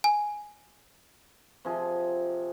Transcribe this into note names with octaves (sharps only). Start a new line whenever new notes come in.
G#5
C3 F3 G#4